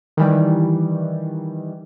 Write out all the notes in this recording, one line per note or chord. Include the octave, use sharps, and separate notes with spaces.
D#3 E3 G3